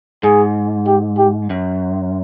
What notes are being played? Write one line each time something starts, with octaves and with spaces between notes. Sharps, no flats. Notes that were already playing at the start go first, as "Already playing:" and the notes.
G#2 G#4
G4
G4
F#2